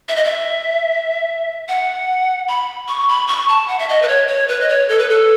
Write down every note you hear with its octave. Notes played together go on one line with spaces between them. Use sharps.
E5
D#5
E5
F#5
B5
C#6
B5
C#6
A5
F#5
E5
D#5
B4
C#5
C#5
B4
D#5
C#5
A4
B4
A4